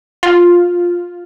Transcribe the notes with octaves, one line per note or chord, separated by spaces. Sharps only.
F4